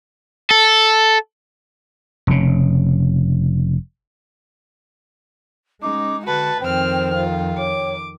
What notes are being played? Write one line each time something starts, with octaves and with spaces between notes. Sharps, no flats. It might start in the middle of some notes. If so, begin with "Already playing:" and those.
A4
F1 C#3
G#3 C#4 D#4 D6
D3 F#4 B4 A5
F2 D#3 C4 C5 G5 F6
F4
C#5 D6